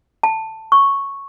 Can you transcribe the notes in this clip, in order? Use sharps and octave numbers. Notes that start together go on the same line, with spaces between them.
A5
C#6